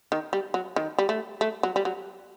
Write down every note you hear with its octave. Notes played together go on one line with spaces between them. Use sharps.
D#3
G3
F#3
D#3
G3
A3
A3
F#3
G3
F#3